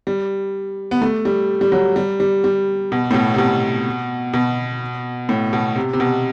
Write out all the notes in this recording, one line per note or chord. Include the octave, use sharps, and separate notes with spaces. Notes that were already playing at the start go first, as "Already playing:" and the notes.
G3
B3
A3
G3
G3
F#3
G3
G3
G3
B2
A2
B2
C3
B2
B2
A2
B2
C3
C3
B2